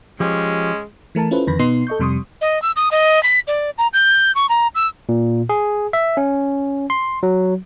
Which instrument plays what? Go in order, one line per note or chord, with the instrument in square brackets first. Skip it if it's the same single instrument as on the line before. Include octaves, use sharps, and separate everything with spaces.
[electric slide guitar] F3 G4 C5 [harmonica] G#3 [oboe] C#4
[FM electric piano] E3 A3 A#4 A5
C#4 E4 F4 A4 B4 C5
F2 D3 D#3 B4 B5 A#6
B2 B3 D#4 C6 C7
A4 D#5 C#6 G6
F2 C3 G3 C6 C#6 D#6
[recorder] D#5
E6
D#6
D#5
B6
D5
A#5
G6
C#6
A#5
E6
[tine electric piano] A#2
G#4
E5
C#4
C6
F#3